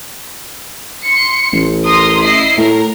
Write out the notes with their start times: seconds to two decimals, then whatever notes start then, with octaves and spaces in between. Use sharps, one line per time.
1.04 C6 C#7
1.52 A1
1.84 A#4 C6 D#6
2.20 E4 D#5 C7
2.58 A2 A#4